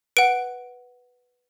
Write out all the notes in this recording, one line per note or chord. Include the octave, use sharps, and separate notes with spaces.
B4 F#5 D7